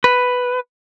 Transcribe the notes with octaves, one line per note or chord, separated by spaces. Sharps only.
B4